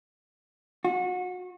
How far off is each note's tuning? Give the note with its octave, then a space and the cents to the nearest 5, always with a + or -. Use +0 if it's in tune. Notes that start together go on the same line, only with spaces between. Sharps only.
F#4 -30